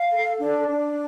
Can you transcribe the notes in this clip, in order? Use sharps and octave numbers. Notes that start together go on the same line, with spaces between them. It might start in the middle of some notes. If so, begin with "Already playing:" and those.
Already playing: F5
A4
D4
D4